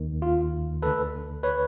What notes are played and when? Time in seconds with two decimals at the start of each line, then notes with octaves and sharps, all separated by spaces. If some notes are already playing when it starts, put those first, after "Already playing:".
Already playing: D#2 D#3
0.22 F4
0.82 D2 D3 A4 B4
1.43 B4 C#5